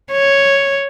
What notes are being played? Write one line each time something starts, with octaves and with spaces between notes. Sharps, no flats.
C#5